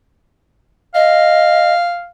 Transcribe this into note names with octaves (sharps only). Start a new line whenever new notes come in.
D#5 F5